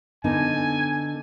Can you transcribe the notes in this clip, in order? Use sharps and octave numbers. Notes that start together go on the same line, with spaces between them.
D3 B3 D#4 G#5